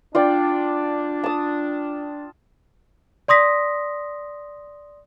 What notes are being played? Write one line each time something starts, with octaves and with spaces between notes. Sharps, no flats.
D4 F4 D5 G5
A5 D#6
D5 C6 D#6 A#6 B6